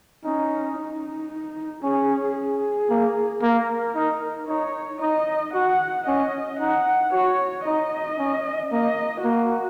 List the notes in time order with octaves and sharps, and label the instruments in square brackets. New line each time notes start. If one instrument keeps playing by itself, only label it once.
[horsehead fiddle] C#4 [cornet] D#4
[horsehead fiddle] D#4
[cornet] C#4 [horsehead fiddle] G#4
[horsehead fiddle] G#4
[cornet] A#3
[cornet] A#3 [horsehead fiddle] A#4
[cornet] D#4
[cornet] D#4 [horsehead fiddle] C#5
[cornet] D#4 [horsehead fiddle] D#5
[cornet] F#4 [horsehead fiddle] F#5
[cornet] C#4 [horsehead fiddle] D#5
[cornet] D#4 [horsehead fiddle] F#5
[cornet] F#4 [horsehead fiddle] C#5
[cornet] D#4 [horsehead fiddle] D#5
[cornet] C#4
[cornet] A#3 [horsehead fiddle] D#5
[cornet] A#3 [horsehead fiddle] F#4